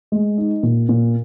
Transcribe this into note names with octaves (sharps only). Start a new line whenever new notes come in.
G#3
D#4
A#2
A#2